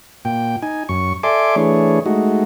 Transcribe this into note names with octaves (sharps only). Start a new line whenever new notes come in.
A#2 G5
D#4 G#5
F#2 C#6
A4 D5 E5 G#5 C6 D6
E3 A3 D4 G#4 C#5
G#3 A3 D#4 F#4